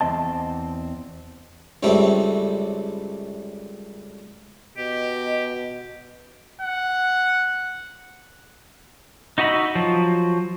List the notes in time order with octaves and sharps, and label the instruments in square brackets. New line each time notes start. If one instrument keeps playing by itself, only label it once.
[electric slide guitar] E2 C4 D#5 A5
[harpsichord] C#2 F#2 G3 A3 C4
[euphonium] B2 [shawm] G4 [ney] D#5
[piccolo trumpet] F#5
[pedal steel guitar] D#4 F#4 D#5 E5 B5
F3 F#3